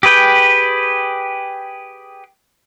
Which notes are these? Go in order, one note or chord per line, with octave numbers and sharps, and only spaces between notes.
G4 G#4 B4 G5